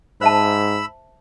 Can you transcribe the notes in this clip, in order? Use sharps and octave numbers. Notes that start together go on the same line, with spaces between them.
G#2 C5 E5 A5 B5 E6